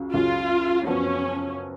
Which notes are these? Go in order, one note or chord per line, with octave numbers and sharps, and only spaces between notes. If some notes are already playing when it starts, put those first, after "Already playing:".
Already playing: C#2 C#3 F#3
C#2 C#3 F#3 F4
F#2 F3 B3 C#4 F#4 C#5